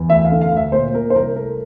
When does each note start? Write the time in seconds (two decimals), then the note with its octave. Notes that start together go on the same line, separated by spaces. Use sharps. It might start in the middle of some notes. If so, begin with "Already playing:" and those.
Already playing: E2
0.09 D2 E5
0.25 F5
0.31 D3
0.41 F5
0.52 D2 E5
0.72 A#2 C5
0.94 A#3 A#4
1.10 C5
1.16 C2 A#4
1.36 A3 A#4